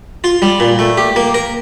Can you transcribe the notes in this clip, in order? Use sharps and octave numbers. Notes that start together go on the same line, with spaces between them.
F4
G3
A#2
A3
G4
A#3
A#4